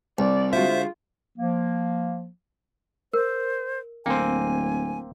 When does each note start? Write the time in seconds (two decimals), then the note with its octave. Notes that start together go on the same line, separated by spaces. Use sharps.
0.19 C2 D5
0.53 D3 G#3 F4 F#4 C5 E5
1.38 F3 A#3
3.13 A#4 C5
4.06 D1 A#3 C4 G5 G#5